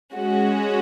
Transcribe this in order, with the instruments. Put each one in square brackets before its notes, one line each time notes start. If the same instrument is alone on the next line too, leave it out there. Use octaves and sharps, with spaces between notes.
[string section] G#3 C#4 F#4